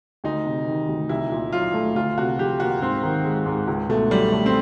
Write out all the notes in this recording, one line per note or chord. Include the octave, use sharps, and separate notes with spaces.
D2 D#4
C3
D#3
D2
C2 E4
A#2
F#3 F4
A3
D2 F4
C3 F#4
F3 G4
A#3 F#4
G#2 C4
D#3
G#3
G#2
C#2
B2 A3
F#3 G3
A3
C4